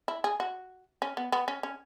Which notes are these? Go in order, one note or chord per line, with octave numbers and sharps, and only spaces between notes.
E4
G#4
F#4
C#4
B3
B3
C#4
C#4